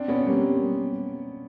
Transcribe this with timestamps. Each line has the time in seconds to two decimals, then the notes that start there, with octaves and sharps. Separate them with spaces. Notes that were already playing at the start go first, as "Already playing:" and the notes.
Already playing: C4 D4
0.08 B3 C#4
0.26 G3 A#3 C4